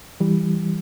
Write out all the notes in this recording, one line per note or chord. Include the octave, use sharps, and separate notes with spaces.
E3 G3